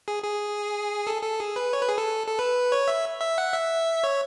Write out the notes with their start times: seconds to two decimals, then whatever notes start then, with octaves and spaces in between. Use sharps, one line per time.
0.08 G#4
0.24 G#4
1.07 A4
1.22 A4
1.40 G#4
1.56 B4
1.73 C#5
1.81 B4
1.89 G#4
1.98 A4
2.28 A4
2.39 B4
2.72 C#5
2.88 E5
3.21 E5
3.38 F#5
3.53 E5
4.04 C#5